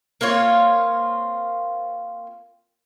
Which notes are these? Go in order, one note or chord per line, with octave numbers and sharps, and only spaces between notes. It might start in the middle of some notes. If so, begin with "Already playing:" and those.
A#3 C4 F4 C#5